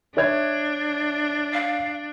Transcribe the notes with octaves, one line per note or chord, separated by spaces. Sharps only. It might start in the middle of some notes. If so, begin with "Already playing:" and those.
D4 C#5 E5 G#6
F5